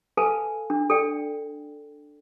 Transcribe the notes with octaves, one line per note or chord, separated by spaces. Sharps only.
A4 B4 F5 G#5 A5
D4
A4 D5 G5